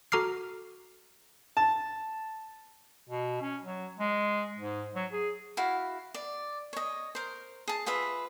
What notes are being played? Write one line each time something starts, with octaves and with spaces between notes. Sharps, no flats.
F#4 A4 A#5 D6 F6 C7
A5
B2
C#4
F#3
G#3
G#2
F#3
G#4
E4 F#4 F5
D5
C#5 D#5
A#4 C5
G#4 A5
F4 G#4 B4 E5